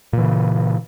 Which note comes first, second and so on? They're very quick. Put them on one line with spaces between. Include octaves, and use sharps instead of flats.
A#2 E3 C#3